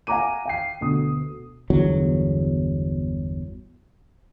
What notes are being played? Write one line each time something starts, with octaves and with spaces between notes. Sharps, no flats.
F5 F#5 G#5 A#5 D6 D#7
F5 G5 C7
D2 B2 D#6
G1 E2 F#3